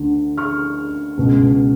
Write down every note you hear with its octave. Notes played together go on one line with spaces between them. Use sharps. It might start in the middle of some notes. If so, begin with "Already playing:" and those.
Already playing: D2 D3
C#6 F6
C#2 B2